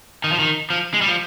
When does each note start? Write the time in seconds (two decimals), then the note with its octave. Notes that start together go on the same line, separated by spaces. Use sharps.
0.24 D#3
0.32 F3
0.39 D#3
0.70 F3
0.94 G#3
1.01 G3
1.08 F3